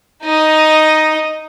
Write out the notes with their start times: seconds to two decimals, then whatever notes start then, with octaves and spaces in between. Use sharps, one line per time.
0.23 D#4 D#5